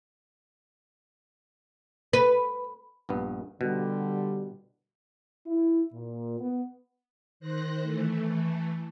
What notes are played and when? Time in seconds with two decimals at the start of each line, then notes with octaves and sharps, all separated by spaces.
2.13 B4
3.09 A#1 G2 B3
3.61 B2 D3 G3
5.47 E4
5.93 A#2
6.39 B3
7.40 D#3 C5 F#6 A#6
7.82 E3 A3